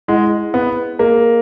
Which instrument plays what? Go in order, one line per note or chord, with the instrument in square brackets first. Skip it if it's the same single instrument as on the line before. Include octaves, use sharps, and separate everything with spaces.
[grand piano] G#3 [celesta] E4 G#4 D#5 F#5
[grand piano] B3
[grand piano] A#3 [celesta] G#4 D#5 A#5